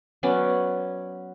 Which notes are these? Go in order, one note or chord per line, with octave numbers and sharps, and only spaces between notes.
F#3 B3 C#4 D5